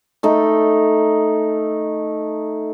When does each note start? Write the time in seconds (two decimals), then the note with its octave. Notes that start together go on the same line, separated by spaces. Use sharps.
0.23 A3 D#4